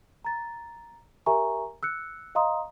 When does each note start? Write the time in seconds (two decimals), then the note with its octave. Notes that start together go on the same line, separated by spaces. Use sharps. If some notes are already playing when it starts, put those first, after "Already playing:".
0.25 A#5 A6
1.26 G4 A#4 E5 G#5 A#5 C#6
1.83 E6 F#6 C#7
2.35 D#5 F5 A#5 C6 D#6